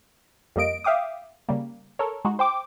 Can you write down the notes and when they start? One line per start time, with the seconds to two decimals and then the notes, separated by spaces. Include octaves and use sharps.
0.56 F2 G3 A#3 D#5 D7
0.84 E5 F5 G5 D6 D#6
1.49 C#3 G3 A#3
1.99 A4 A#4 C#5
2.25 G#3 D#4 F#4
2.39 C5 G5 D6